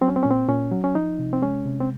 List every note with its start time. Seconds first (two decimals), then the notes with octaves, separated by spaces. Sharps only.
0.01 F#3 C4
0.08 C#4
0.16 C4
0.23 A#2 C#4
0.30 C4
0.48 A#2 C#4
0.72 F#3
0.84 C#4
0.95 F3 D#4
1.19 C3
1.33 C4
1.42 G#3 C#4
1.66 C3
1.80 C4